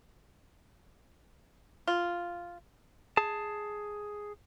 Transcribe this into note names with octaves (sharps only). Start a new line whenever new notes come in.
F4
G#4 A5